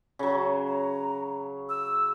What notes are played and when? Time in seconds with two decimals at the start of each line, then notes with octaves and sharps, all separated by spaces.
0.19 C#3 F#3
0.68 A#5
1.69 E6